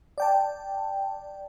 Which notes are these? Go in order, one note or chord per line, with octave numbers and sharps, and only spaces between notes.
D5 G5 A5